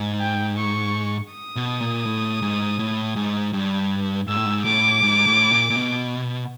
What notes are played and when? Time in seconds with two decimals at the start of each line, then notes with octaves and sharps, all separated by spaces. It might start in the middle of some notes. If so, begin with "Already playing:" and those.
Already playing: G#2
0.20 G5
0.57 C#6
1.32 D#6
1.56 B2
1.80 A#2
2.05 A2
2.42 G#2
2.79 A2
3.16 G#2
3.53 G2
4.28 G#2 E6
4.36 A2
4.46 G#2
4.65 A2 D6
5.03 G#2
5.27 A2
5.51 A#2
5.70 A#2
5.76 B2